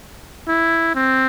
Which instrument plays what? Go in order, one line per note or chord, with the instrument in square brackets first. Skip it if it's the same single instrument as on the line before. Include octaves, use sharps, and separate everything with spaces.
[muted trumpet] E4
C4